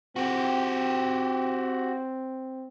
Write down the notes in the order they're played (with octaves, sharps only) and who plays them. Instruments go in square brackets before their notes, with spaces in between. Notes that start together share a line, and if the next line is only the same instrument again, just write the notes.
[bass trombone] C4 [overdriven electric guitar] F#4 G4